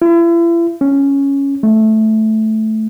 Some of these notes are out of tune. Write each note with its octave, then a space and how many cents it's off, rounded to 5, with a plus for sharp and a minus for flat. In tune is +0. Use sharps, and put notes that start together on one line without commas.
E4 +40
C#4 +0
A3 -10